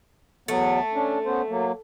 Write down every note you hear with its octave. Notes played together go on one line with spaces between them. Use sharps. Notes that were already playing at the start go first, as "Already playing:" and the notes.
E2 F#3 A3 B3
C#4 D4
B3 C#4 C5
F#3 A#3